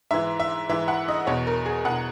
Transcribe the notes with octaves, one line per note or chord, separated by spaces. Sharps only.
G#2 E3 E5
E5
G#2 E3 E5
F#5
D#5
E2 B2 C#5
A#4
G#4
E2 B2 F#5